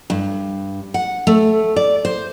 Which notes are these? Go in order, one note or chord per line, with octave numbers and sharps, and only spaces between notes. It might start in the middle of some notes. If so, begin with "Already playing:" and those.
G2
F#5
A3
D5
C5